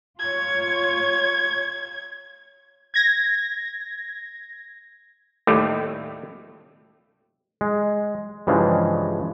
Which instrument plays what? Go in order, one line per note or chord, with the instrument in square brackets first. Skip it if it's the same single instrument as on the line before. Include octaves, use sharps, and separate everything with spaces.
[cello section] F4 C#5 [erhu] G#6
[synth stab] G#6 A#6
[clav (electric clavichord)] D#2 A2 G3 A3
G#3
G2 C#3 E3 F3 G#3